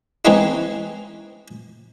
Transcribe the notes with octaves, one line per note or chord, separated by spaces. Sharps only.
E3 G#3 C4 C#4 D#4 E4